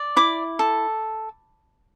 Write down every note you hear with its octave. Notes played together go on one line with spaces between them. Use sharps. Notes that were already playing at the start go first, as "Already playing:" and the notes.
Already playing: D5
E4 D6
A4